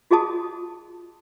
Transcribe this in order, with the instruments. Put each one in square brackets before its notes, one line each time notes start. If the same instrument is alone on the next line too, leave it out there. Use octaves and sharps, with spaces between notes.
[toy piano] F4 F#4 G#4 D#5 A5 D#6